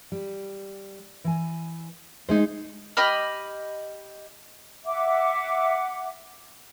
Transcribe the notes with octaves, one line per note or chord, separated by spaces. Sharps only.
G3
E3 G#5
G#3 A3 D#4 G#4 C5
G4 D#5 B5 F6
E5 F#5 D6